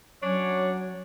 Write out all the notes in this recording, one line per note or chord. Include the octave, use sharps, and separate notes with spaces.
F#3 C#4 D4 C#5